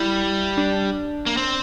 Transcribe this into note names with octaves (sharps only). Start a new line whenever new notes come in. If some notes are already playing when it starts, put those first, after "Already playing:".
Already playing: G3 E4
D4
A#3
C4